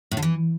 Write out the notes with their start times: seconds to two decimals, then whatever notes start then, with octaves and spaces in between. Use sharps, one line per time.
0.12 A2
0.17 D3
0.22 E3